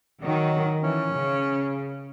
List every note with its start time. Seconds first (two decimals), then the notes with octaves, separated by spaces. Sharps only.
0.22 D#3 F#3
0.83 E3 C#4
1.13 C#3